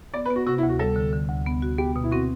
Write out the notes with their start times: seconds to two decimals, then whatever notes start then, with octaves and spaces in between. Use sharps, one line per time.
0.14 B3 D5
0.26 B4
0.30 B3
0.36 F#4
0.47 C3 F#4
0.58 E4
0.63 D2
0.69 F#4
0.79 G3 A4
0.96 D3
1.13 D3
1.29 D2
1.46 B3
1.62 F#4
1.78 B3 G4
1.96 B2
2.04 E4
2.11 C4 F#4